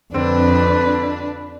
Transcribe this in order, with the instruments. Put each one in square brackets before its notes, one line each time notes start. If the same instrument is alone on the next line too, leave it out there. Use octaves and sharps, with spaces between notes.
[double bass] F2 [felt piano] D3 C4 [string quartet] D4 [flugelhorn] B4